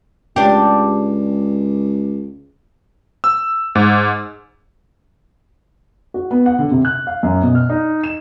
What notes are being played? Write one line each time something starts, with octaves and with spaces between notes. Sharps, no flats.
C#2 D4 G4
E6
G#2
F#4
B3
F#5
D3
C3
F#6
F5
F#2
B2
F6
D#4
E7